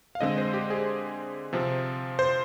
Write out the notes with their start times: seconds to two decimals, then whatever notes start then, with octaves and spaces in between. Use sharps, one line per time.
0.15 F5
0.21 D3 G#3 C4 D#5
0.38 C5
0.54 G4
0.70 G#4
1.53 C3 F3 C4
2.19 C5